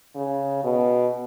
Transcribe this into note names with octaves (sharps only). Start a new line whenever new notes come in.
C#3
B2